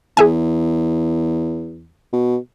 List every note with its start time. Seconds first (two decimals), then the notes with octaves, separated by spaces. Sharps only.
0.17 E2 G#4 E5 G#5
2.13 B2